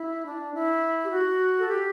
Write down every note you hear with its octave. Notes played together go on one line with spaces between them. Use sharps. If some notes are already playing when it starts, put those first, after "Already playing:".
Already playing: E4
D4
E4
G4
F#4
A4
G4